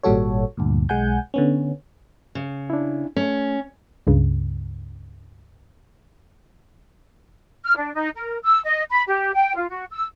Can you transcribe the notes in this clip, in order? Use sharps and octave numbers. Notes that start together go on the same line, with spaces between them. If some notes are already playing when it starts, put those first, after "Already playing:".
G#1 A#2 G3 F#4 A4 C#5
D2 G2 A#2
B1 G#3 F#5 G#5 G6
D3 B3 C#4
C#3
D4 E4
A3 C#4
C#2 G2 C#3
F6
D4
D#4
A#4
E6
D#5
B5
G4
G5
F4
F#4
E6